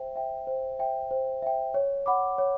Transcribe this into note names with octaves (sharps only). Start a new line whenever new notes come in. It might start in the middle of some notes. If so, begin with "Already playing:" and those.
Already playing: C5 E5 G5
E5 G5
C5
E5 G5
C5
E5 G5
C#5
F#5 B5 D6
C#5